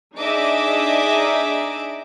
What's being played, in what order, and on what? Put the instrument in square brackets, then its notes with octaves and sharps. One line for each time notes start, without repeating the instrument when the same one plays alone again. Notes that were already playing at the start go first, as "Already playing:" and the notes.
[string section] D4 D#4 G#4 D#5 E5 D6